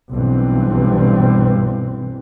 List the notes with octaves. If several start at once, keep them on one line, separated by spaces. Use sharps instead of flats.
B1 G2 E3 C4